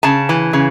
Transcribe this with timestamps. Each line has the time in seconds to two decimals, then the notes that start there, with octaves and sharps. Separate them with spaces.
0.03 C#3 A5
0.29 E3
0.53 C#3